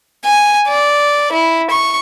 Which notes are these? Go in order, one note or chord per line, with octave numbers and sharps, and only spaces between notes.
G#5
D5
E4
C#6